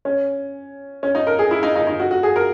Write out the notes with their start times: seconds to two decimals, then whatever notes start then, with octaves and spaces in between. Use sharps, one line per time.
0.05 C#4
1.03 C#4
1.15 D#4
1.27 A#4
1.39 G#4
1.51 E4
1.63 D#4
1.76 D#4
1.87 D#4
2.00 F#4
2.11 F#4
2.23 G#4
2.36 A#4